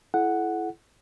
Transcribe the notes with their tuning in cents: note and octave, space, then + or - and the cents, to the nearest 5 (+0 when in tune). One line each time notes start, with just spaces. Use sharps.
E4 +20 A4 -35 F#5 +0